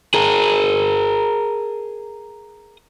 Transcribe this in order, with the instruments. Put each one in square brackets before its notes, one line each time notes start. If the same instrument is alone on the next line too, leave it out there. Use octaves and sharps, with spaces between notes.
[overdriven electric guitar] G#4 A#4